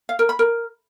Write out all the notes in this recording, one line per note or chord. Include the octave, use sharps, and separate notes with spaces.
F5
A#4
B5
A#4